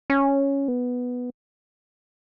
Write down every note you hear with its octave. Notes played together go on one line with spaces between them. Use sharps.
C#4
B3